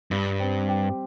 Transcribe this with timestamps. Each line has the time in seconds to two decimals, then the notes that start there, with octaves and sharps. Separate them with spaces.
0.11 G2 G3
0.40 C4
0.69 G4